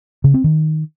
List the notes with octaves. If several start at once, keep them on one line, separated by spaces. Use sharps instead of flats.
C#3
C4
D#3